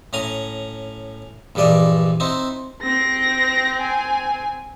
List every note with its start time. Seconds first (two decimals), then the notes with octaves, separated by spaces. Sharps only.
0.13 A2 C#4 A#5 D#6
1.55 A#1 G2 E3 D5 D#5
2.20 C4 D#4 E4
2.83 C4 A#6
3.81 G#5